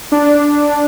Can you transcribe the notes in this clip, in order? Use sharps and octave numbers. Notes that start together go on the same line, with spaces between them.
D4